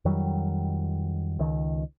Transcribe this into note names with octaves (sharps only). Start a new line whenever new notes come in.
F2 D#3 F#3 G3
C#2 D#3